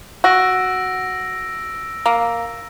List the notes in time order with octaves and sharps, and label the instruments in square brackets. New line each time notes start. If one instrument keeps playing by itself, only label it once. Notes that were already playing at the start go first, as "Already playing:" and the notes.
[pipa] F#4 [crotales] E6 A#6 D7
[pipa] A#3